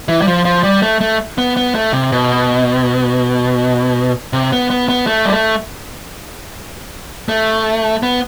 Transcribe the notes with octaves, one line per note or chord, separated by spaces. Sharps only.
E3
G3
F3
F3
G3
A3
A3
B3
B3
A3
C3
B2
C3
B3
B3
B3
A3
G3
A3
A3
B3